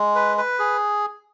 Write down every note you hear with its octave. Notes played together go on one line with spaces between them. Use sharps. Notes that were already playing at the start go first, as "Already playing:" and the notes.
Already playing: G#3
B4
B4
G#4